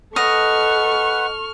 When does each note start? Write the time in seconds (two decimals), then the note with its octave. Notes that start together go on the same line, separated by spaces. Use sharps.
0.16 A4 B4 D#5 F#5 C#6 F6